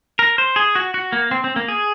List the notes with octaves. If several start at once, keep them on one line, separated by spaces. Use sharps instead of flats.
A#4
C5
G#4
F#4
F#4
A#3
C4
C4
A#3
G#4